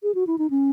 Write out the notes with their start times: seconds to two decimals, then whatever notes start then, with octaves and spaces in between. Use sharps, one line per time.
0.03 G#4
0.15 F#4
0.27 E4
0.38 D#4
0.50 C#4